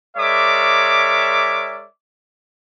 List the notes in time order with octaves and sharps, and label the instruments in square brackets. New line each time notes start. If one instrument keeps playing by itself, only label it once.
[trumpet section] G#3 A#4 C#5 D5 E5 D6